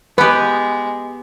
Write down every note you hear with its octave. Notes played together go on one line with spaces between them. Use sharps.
G#3 B3 G4 B4